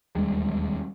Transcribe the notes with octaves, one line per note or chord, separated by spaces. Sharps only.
E1 D#2 G3 G#3